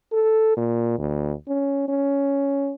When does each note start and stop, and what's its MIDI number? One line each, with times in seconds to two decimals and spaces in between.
0.13 0.52 69
0.57 0.98 46
0.99 1.32 38
1.48 1.83 61
1.88 2.73 61